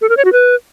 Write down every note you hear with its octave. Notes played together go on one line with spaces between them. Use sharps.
A4
A#4
C#5
F#4
B4